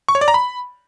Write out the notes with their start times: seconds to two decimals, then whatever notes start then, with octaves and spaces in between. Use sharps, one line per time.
0.08 C#6
0.15 C#5
0.21 D5
0.28 A#5
0.34 B5